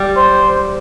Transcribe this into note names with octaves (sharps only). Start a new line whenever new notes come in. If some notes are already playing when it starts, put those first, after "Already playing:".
Already playing: G3
C5